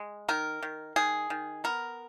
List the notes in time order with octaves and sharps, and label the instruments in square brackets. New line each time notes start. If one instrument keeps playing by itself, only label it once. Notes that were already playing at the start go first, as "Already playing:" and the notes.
Already playing: [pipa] G#3
D#3 A#4
D#3
D#3 G#4
D#3
B3 A#4